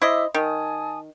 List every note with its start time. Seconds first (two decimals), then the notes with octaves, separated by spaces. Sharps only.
0.02 E4 C5 D#5 E5 D6 E6
0.34 D#3 G#5 A5 D#6